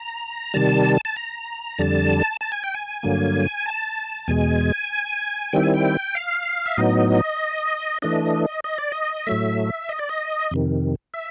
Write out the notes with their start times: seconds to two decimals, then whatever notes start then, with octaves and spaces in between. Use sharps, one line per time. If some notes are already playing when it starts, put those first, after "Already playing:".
Already playing: A#5
0.54 C3 D#3 G3 A5
1.05 A5
1.16 A#5
1.78 F2 D3 G3 A5
2.41 A5
2.52 G#5
2.64 G5
2.74 G#5
3.03 G2 D3 F#3 A#3
3.66 A5
4.28 E2 B2 G#3 G#5
5.53 D#3 G3 C4 E4 G5
5.63 G#5
5.74 G5
6.15 F5
6.66 E5
6.77 A2 F#3 B3 D#4 D#5
8.02 E3 A3 D4 D#5
8.64 D#5
8.79 D5
8.92 D#5
9.27 A2 F#3 A3 E5
9.89 D#5
9.99 D5
10.09 D#5
10.51 F2 C3 D#3
11.14 E5